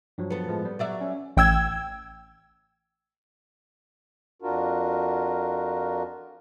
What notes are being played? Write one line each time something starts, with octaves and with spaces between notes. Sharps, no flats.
G2 F3 F#3
B3 A4
A2 F3 G#3
G3
F#3 D5 E5
C#4
A1 G5 E6 G#6
F2 D4 F4 F#4 A#4